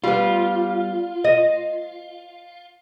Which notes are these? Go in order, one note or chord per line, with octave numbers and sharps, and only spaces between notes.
G3 B3 F4
D#5